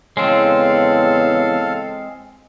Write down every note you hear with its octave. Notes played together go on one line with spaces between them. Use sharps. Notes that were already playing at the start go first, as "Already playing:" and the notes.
E2 C#3 G#3 C4 A4 F5